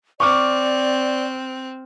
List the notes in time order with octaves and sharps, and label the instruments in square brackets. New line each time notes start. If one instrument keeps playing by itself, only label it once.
[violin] C4 [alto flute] D5 [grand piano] C#6 D6 F6